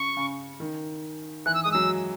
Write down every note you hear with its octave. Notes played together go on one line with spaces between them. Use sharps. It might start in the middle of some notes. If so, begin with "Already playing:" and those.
Already playing: C#3 C#6
C#3
D#3
E3 F#6
E6
G#3 D#6
F#3 E6